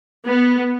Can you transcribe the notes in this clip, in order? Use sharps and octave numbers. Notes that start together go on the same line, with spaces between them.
B3